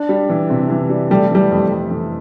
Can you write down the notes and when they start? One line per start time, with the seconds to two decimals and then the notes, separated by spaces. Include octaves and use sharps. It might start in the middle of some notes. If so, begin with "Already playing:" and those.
Already playing: D4
0.09 G3
0.29 E3
0.50 C3
0.70 E3
0.90 G3
1.10 G3 A3
1.31 E3 G3
1.51 F2
1.72 F2
1.91 E3